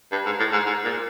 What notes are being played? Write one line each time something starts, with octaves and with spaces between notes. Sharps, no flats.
G2
G#2
A2
G#2
G#2
A#2